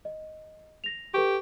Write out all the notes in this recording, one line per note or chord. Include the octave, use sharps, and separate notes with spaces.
D#5
A#6 F7
G4 A4 B4 C#6